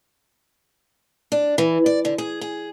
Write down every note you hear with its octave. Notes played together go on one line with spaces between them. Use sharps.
D4
E3
D5
D3
G#4
G#4